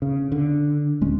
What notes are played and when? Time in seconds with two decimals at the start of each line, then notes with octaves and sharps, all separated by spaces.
0.02 C#3
0.32 D3
1.01 D1 G#3 C#4